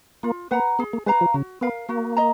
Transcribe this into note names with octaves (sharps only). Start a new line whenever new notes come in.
A#3 F4
A#3 B4 F#5 A#5
B3 G#4
A#3
G#3 B4 F5 A#5
F3
C#3 F#4
B3 A#4 F5
A#3 F#4
D#5 A#5